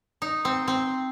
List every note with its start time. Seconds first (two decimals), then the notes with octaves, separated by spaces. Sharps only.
0.22 D#4
0.45 C4
0.68 C4